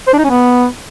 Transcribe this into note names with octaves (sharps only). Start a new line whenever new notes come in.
C5
D4
D#4
C#4
B3